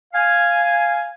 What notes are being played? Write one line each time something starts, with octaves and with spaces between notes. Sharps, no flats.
F5 G#5